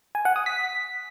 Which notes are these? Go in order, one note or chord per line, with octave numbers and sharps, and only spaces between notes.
G#5
F#5
D#6
B6